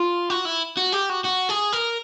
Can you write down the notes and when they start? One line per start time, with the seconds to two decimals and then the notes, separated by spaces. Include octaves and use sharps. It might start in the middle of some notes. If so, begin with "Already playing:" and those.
Already playing: F4
0.30 F#4
0.45 E4
0.77 F#4
0.92 G4
1.09 F#4
1.24 F#4
1.49 G#4
1.73 A#4